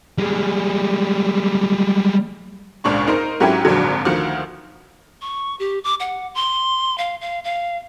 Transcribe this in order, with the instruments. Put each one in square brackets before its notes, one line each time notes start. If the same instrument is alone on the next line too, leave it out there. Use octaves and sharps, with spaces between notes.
[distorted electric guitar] G3 G#3
[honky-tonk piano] G#1 C#2 A#2 D4 C#6
D#4 A#4 C5
G#2 F#3 C#4 E4 G4 G#6
G#1 F2 A#2 D3 F#3
D2 D#3 F3 F#4 C#7
[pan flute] C#6
G4
D6
F#5
C6
F5
F5
F5